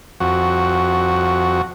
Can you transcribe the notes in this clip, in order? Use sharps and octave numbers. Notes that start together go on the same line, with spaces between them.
F2 F#4